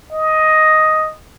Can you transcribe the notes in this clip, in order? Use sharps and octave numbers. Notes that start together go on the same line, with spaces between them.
D#5